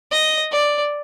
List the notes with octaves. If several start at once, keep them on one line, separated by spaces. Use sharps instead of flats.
D#5
D5